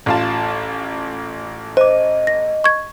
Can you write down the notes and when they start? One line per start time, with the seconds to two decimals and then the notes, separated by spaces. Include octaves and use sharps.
0.06 A1 F4 A5
1.77 C5 D#5 D6
2.27 A#6
2.64 C#6 G#6